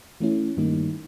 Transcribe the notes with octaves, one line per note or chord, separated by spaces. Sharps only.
E3 A3 C#4 E4
G2 D#3 G3 A#3 D#4